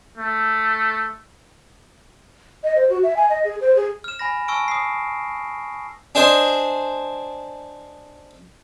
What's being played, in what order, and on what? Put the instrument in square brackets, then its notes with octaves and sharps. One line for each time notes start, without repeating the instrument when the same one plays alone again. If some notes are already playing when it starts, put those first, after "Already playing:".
[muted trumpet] A3
[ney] D#5
C5
F#4
E5
G#5
D#5
G#4
C5
G#4
[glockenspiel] F6 E7
G#5 B5 A#6
G#5 A5 C#6 E6 F6 D7
D#6 C7
[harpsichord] D4 G#4 C5 D#5